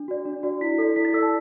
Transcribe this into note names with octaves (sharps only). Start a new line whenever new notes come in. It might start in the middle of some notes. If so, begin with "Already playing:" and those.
Already playing: D4
F#4 D5
D4
F#4 D5
E4 B6
A4 D5
E4 B6
A6
A4 D5 E6
A5